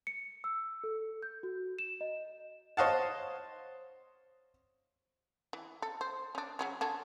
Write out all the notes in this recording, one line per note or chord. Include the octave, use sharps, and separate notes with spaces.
C#7
E6
A4
G6
F#4
E7
D#5
C5 C#5 D#5 F5 F#5 A5
E3
A4
C5
C#4 D4
C#3 F#3 C#4
D3 C#4 A5